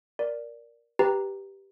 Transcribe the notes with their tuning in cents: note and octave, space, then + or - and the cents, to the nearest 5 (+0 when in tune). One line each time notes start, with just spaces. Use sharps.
A#4 +10 D5 +0
G4 +0 B4 -10 A#5 +0